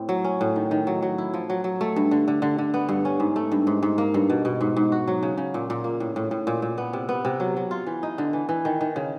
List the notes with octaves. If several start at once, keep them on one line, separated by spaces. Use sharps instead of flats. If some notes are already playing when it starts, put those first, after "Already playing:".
Already playing: A2 C4
F#3
C#4
A2
D#3
D#3
F#3
F#3
E4
F3
F#3
F#3
A3
G2
D3
D3
D3
D3
B3
G2
C#4
G#2
A3
G2
G#2
G#2
A#3
G2
B2
B2
G#2
G#2
F#4
F#3
C#3
C#3
A#2
A#2
A#3
A2
A2
A2
A#2
A#2
B3
C3
B3
C3
F#3
F#3
F4
E3
D#4
D3
E3
E3
D#3
D#3
C#3